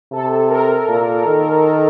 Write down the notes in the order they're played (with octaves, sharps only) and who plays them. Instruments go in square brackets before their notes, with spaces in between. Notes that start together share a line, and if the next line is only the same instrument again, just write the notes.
[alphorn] C3 [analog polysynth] A4
[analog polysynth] A#4
[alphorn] A#2
D#3